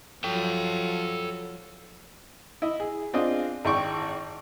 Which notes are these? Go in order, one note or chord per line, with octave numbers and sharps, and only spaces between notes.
F3 F#3 A4 G5
E4 D#5
G#4
C4 D4 F4 G#4 D#5
G#1 E4 D5 G5 C#6 D6